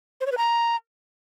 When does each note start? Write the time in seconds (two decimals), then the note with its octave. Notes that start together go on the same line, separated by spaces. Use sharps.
0.21 C5
0.26 C#5
0.32 B4
0.37 A#5